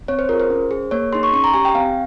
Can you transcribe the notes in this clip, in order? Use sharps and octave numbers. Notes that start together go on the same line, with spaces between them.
C4 C#5
C5
F4 G#4 A#4
C5
C#4
G#4
A#3 C#5
D#4 G#4 C6
C#6
C#4 C#6
A#5
G4 G#5
G5
C4 F5